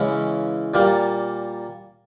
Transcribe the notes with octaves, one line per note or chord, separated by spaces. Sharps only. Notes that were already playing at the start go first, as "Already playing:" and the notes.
Already playing: C#3 E3 G#3 C#4 E4
A#2 G3 A#3